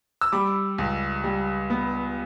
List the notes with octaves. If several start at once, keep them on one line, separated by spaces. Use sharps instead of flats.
E6
G3 B5 D6
C#2
G3
B3